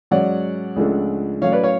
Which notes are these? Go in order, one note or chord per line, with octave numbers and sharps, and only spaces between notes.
G#2 F#3 C#4 D5 F#5
C#2 C#3 F3 A3 D4
A2 F#3 C#4 C#5 F5
B4 D5
C#5 F5